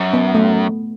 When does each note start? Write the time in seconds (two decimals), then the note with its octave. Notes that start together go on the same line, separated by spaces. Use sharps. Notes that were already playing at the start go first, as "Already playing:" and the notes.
Already playing: F#2
0.13 B3
0.34 A3